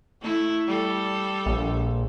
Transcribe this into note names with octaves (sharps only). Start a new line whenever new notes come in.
A3 E4
G3 A4
A#1